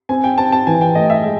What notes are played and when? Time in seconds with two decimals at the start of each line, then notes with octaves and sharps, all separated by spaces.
0.09 C4 G#5
0.24 G5
0.38 C4 A5
0.52 A5
0.67 E3 G#5
0.81 G5
0.95 A3 D#5
1.10 E5
1.24 G#3